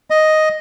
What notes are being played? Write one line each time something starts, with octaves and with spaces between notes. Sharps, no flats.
D#5